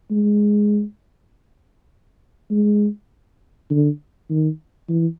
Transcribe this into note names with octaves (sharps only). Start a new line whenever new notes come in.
G#3
G#3
D3
D#3
E3